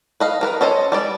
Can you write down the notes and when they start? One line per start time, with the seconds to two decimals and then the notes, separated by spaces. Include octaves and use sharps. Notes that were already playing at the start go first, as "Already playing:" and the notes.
0.20 B4 D#5 F5
0.41 D#3 A#4 B4
0.61 C#4 A4 C5 D#5
0.92 G3 G#3 D5